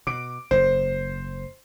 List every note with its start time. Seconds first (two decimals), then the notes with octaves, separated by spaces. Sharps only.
0.07 B2 D6 D7
0.51 F#1 G#2 C5